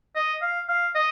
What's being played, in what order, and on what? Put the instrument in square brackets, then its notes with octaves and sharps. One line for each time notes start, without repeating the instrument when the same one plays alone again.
[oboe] D#5
F5
F5
D#5